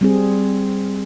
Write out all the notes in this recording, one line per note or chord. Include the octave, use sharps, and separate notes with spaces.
G3 C4 G#4